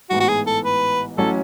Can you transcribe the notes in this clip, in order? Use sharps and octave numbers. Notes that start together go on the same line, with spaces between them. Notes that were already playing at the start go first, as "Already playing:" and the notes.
A1 G#2 E3 B3 F#4
F#4
G#4
A4
B4
A1 A2 F#3 C#4 A4